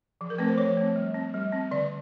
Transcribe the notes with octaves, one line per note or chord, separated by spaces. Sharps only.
F3
A#4
A3 C4 B4
C5
F3 C#5
A3 C4
G3
C4
G3
C4
D3 D5